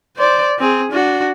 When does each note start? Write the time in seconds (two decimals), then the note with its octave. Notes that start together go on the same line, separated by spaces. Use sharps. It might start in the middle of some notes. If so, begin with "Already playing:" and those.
0.17 C5 D5
0.59 C4 G#4
0.91 D4 F#4